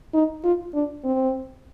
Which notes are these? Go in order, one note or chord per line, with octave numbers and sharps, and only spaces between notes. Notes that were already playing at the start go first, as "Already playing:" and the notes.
D#4
F4
D4
C4